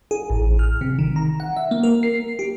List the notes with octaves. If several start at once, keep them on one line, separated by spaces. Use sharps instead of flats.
G#4
A1
F6
C3
D#3
A#5
F#5
E5
A#3
A#4
C7
G4